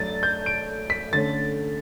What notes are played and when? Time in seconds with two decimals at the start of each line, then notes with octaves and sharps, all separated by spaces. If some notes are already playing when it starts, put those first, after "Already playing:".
Already playing: F#3 A3 D4 A6
0.23 G6
0.46 D7
0.90 B6
1.13 D3 A3 C#4 A6